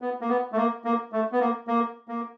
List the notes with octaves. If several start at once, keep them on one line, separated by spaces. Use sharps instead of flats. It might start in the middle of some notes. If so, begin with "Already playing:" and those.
B3
A#3
B3
A3
A#3
A#3
A3
B3
A#3
A#3
A#3